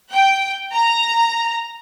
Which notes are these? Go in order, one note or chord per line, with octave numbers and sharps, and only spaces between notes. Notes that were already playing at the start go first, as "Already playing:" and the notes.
G5
A#5